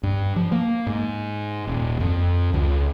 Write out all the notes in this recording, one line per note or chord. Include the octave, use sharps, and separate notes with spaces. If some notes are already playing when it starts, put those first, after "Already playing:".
G2
F3
A#3
G#2
D#1
F2
C#2